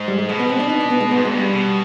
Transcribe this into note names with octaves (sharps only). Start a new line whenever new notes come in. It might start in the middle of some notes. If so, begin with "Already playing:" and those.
Already playing: G#2
G3
G#3
B2 G#3
B3
C4
D4
D#4
D4
B3
G#3
G#2 B3
G#3
G2
G3
B2